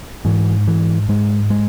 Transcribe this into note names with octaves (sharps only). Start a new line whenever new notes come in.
G#2 E3
E3
G#2 G#3
G#3